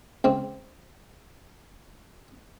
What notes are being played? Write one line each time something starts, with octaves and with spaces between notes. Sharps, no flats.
C#2 C4